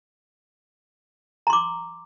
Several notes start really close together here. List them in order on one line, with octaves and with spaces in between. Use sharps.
A#5 C6 D6